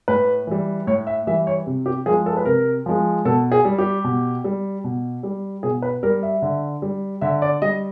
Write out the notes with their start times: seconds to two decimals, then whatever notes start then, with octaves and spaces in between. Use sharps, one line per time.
0.08 A2 B4
0.47 E3 G3
0.87 A2 C#5
1.07 E5
1.27 E3 G3 E5
1.47 C#5
1.67 C3
1.86 G4
2.06 F3 G#3 G#4
2.26 A4
2.37 B4
2.45 C3 A#4
2.86 F3 G#3
3.25 B2 A4
3.52 G#4
3.65 G3
3.79 G4
4.04 B2
4.44 G3
4.84 B2
5.23 G3
5.63 B2 G#4
5.82 B4
6.03 G3 A#4
6.23 E5
6.42 D3
6.82 G3
7.21 D3 E5
7.42 D5
7.62 G3 D#5